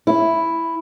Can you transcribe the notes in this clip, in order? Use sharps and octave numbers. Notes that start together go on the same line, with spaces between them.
E4